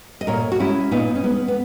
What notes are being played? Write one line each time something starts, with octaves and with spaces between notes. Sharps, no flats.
D#5
A#2 A#4 C#5
F#4
G#3 C#4 E4
A#2 B3 D#4
C#4
G#3 B3
B3